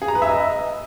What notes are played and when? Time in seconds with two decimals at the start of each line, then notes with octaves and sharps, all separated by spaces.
0.02 G#4
0.08 A#5
0.15 B4
0.22 E5
0.29 D#5